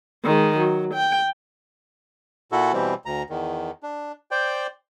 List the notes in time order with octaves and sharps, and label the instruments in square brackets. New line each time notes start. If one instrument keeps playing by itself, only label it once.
[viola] D#3 G#3
F#3
G5
[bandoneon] A#2 E4 F#4 A4
B2 E3 G3 C4
D2 A#5
E2 D#3
D4
C5 D5 G5